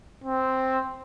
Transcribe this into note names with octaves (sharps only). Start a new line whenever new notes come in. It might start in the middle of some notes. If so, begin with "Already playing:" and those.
C4